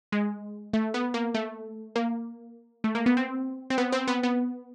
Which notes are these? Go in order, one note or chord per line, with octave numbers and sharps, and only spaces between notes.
G#3
A3
B3
A#3
A3
A#3
A3
A#3
B3
C4
C4
B3
C4
B3
B3